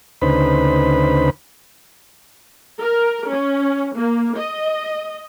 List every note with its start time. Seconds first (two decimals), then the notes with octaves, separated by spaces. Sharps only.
0.22 D2 C#3 D#4 B4 C5 B5
2.82 A#4
3.29 C#4
3.96 A#3
4.37 D#5